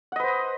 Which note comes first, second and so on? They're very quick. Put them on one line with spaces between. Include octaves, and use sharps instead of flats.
F#5 D#5 B4 C5